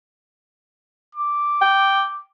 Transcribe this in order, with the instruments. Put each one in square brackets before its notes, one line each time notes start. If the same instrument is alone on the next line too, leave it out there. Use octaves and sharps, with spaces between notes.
[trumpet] D6
[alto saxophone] G5